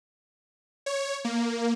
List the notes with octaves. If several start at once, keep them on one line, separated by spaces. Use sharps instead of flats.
C#5
A#3